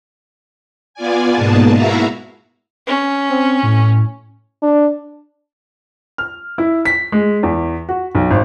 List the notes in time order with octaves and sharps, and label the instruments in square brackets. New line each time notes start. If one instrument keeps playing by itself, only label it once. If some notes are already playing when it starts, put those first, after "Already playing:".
[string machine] B3 F4 D5 G#5
G#2 B2 A#3 B3 G#4 A5
E4 F#4 E5 F5 A#5
[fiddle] C#4
[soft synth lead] C4
A2
[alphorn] D4
[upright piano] F6
E4
B6
G#3
E2
F#4
B1
G#1